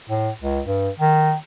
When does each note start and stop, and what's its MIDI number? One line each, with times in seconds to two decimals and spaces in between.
0.09 0.30 45
0.42 0.60 37
0.66 0.89 43
1.00 1.34 51